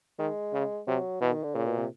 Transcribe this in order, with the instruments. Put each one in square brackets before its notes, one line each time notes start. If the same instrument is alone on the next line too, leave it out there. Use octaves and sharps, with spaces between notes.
[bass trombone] D#3 [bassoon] G#3
[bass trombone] C#3
[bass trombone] C3 [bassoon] F#3
[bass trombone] B2 [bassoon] E3
[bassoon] D#3
D3
[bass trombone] A#2 [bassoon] C#3
[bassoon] B2
C3